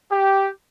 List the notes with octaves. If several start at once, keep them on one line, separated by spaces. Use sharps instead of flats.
G4